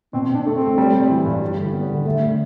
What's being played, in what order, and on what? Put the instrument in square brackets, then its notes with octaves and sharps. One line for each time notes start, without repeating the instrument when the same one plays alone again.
[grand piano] B2 [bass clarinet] C4
[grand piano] B2 [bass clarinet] D4
[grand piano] A3
[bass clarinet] C4
[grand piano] A3
G3
G3
E3
G2
G3
D3
B3
D3
[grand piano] D3 [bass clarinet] A3
[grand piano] D3